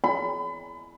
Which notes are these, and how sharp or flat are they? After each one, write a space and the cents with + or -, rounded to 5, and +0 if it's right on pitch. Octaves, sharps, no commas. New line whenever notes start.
B5 +35